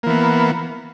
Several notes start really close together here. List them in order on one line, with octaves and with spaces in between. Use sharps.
A#3 E3 B3